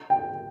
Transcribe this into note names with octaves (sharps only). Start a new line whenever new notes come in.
G5